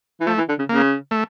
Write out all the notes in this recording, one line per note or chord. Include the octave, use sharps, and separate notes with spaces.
E3
F3 A3
E3
D3
C#3
C#3 A#3
A3